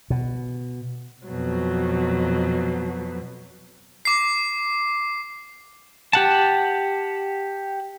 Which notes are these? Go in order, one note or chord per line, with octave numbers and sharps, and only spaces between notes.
B2
F2 B2 F#3
D6 C7
G4 F#5 A5